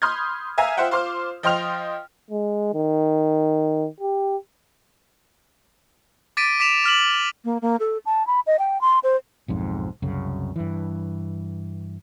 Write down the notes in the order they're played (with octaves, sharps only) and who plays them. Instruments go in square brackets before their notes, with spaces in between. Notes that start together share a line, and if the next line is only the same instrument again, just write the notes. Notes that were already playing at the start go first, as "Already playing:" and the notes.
[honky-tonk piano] B5 C6 D#6 F6 G6 G#6
E5 F5 G#5 A#5
F4 C5 E5 F#5 G5
F4 C5 C6 D6 F6
F3 D#5 G5 C6 F6 F7
[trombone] G#3
D#3
G4
[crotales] D6 A6 B6 D7 D#7
D6 B6 D7 E7 F7
D6 F6 B6 F#7
[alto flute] A#3
A#3
A4
A5
B5
D#5
G5
C6
C5
[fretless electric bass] B1 F2 G#2
C2 F#2 C#3
G2 E3